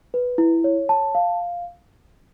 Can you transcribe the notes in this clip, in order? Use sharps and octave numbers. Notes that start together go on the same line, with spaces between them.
B4
E4
C#5
A5
F5